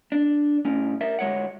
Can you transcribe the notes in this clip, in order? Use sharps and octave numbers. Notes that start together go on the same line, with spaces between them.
D4
C2 A2 C#4
A#4 D5 E5
D2 G#3 C#5 F#5